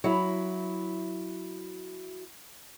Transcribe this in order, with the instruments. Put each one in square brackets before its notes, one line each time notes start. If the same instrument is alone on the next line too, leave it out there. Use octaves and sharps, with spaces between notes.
[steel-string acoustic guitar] F#3 E4